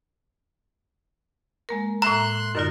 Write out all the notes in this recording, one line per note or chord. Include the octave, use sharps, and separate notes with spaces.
G#3 A#3 A#4
A2 E5 A#5 C6 E6 F#6
F#2 D3 D#4 F4 A#4